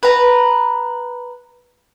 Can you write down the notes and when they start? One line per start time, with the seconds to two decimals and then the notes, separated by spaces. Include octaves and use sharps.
0.03 B4 A#5